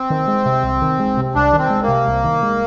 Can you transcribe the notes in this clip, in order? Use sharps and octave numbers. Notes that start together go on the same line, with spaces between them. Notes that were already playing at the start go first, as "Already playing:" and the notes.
Already playing: C4
D#3
G#3
C3
C2
D#3
G#3
C3
C2 D4
D#3
C4
G#3
A#3
C3
C2
D#3
G#3